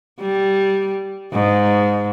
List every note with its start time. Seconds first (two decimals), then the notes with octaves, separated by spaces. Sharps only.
0.20 G3
1.33 G#2